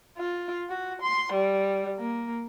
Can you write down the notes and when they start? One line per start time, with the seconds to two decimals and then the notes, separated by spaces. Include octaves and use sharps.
0.18 F4
0.69 F#4
1.02 C6
1.33 G3
1.99 A#3